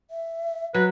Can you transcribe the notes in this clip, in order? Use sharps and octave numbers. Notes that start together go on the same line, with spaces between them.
E5
F#3 B4